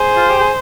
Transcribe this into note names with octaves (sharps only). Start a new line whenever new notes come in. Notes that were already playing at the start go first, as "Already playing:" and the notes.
Already playing: G#4 C5
F4
G4
G#4